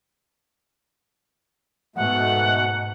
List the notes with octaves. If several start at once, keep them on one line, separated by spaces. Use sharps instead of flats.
G#2 B2 A3 F#5